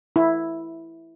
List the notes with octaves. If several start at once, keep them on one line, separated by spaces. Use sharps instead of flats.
E4